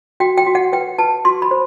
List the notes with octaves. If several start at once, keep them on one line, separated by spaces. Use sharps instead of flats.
F#4 G5
G5
F#4
F#5
B4 G5
B4 A5
F#4 C6
B5
C5